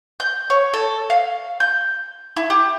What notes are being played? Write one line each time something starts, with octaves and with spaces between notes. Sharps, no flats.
G6
C#5
A4
F5
G6
E4
G4